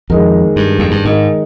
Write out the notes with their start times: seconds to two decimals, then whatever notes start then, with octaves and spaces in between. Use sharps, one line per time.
0.10 F2 D#3 G#3 D#4 A#4 D#5
0.56 G2
0.79 F2
0.91 G2
1.05 G#2 D#3 G#3 D#4 A#4 D#5